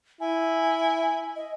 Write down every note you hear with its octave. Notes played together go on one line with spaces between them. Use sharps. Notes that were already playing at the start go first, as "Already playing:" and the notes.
E4 G#5
D#5